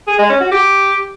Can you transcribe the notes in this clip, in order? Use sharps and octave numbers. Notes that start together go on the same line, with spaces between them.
G#4
G#3
C#4
F#4
G4